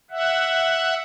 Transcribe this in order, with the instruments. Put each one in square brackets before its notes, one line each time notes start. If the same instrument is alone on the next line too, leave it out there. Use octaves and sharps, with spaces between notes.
[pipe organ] E5 F#5